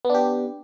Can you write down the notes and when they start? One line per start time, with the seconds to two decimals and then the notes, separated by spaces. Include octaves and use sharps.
0.05 B3
0.10 D4
0.14 G4